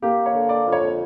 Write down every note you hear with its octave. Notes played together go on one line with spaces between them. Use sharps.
A#3 G4
C#5
D3
D5
F2
C#5